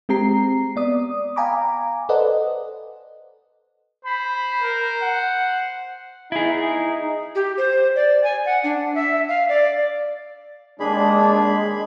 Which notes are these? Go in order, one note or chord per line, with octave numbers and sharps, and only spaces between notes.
G#3 C4 G4 A#5 C7
B3 D5 D#6
F5 G5 G#5 A#5 B5 D6
A4 B4 C5 D5 D#5 F#5
C5 B5
A#4
F#5
D#4 E4 G#4
G4
C5
D5
G#5
F#5
D4
E5
F5
D5
D#2 G#3 D4 G#4 B5